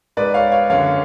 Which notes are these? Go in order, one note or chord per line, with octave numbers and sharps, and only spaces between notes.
G#2 B4 D5
C#5 F5
C#5 F5
F#2 D3 C#5 F5